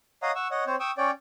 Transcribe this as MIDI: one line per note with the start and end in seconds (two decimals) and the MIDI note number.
0.23 0.31 73
0.23 0.31 75
0.23 0.31 77
0.23 0.31 78
0.23 0.31 82
0.23 0.31 87
0.36 0.47 78
0.36 0.47 85
0.36 0.47 88
0.51 0.64 73
0.51 0.64 75
0.51 0.64 78
0.67 0.76 60
0.67 0.76 72
0.67 0.76 73
0.80 0.91 79
0.80 0.91 85
0.80 0.91 87
0.80 0.91 88
0.98 1.11 61
0.98 1.11 73
0.98 1.11 74
0.98 1.11 79